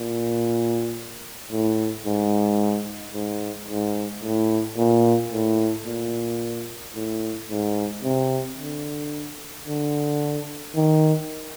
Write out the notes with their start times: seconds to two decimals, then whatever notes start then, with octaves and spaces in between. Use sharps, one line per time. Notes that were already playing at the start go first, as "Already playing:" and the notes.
Already playing: A#2
1.51 A2
2.05 G#2
3.14 G#2
3.68 G#2
4.23 A2
4.78 A#2
5.32 A2
5.86 A#2
6.95 A2
7.50 G#2
8.04 C3
8.59 D3
9.67 D3
10.75 D#3